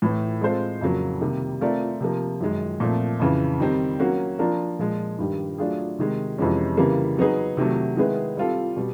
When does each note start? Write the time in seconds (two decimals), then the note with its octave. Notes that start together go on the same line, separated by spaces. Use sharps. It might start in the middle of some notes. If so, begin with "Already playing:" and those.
0.02 A2 E3 A3
0.41 G#3 C4 F4 A4 C5
0.81 F2 C#3 F#3 A#3
1.21 C3 D#3 G3 A#3
1.61 A3 C4 F4 A#4 D5
2.00 C3 F3 A#3
2.40 F#2 D#3 G#3
2.80 A#2 F3 A3 C4
3.20 F2 C#3 E3
3.60 D#3 G3 C4 D#4
4.00 F#3 A#3 C#4 F#4
4.39 F3 A#3 D4 F4 A#4
4.79 A#2 F3 G#3
5.18 G2 D#3 G3
5.58 F#3 A3 D4 F4 G#4
5.99 C3 D#3 G#3
6.38 F2 C3 E3 G#3 C#4
6.77 C#3 E3 G3 A#3
7.17 F#3 B3 D#4 G#4
7.57 C3 D#3 F#3 A3
7.97 D#3 G#3 B3 E4 G#4
8.37 G3 C4 F4 A4
8.76 B2 G3